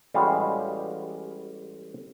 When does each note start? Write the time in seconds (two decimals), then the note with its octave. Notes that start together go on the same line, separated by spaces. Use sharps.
0.14 A1 G3 G#3 F#4 G4 F5